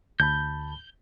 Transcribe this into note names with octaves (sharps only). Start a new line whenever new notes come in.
D2 A5 B5 G6